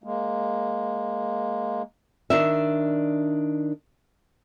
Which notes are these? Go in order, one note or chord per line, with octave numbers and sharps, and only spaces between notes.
G#3 A#3
D#3 D4 E5